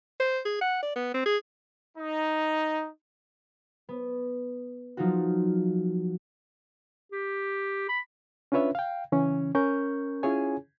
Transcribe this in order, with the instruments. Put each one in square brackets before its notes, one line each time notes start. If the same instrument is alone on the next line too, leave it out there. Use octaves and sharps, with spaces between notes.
[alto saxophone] C5
G#4
F#5
D5
B3
C4
G#4
[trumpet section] D#4
[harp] B3
F3 F#3 D#4 F4 F#4
[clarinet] G4
B5
[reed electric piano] C#4 D4 F4 B4 C#5 E5
F5 G5
C#3 E3 C#4
C#4 A#4 C#6 G6
C#4 E4 F4 G#4 C#5 G#5